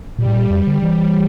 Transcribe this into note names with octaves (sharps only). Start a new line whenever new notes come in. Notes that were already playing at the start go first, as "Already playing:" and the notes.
A#2 G3
A2
A#2
F2 G3
D3
E3